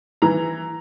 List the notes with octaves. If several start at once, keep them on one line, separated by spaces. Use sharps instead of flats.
E3 A#5